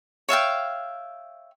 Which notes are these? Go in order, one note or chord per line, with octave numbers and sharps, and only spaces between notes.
C#5 E5 F5 G5